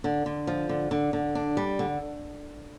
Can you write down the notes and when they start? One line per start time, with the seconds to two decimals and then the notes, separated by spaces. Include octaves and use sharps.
0.04 D3
0.26 D3
0.47 F3
0.69 D3
0.91 D3
1.13 D3
1.35 D4
1.57 G3
1.79 D3